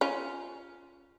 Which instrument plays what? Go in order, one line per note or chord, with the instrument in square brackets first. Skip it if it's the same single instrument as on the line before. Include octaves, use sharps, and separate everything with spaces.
[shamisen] C#4 F4